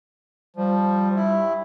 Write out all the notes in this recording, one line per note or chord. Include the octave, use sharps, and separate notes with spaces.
F3 G3
G2 E4